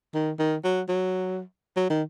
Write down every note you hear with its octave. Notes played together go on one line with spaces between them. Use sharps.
D#3
D#3
F#3
F#3
F#3
D#3